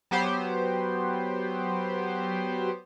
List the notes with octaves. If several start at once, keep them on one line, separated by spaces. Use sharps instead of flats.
F#3 B3 G4 C5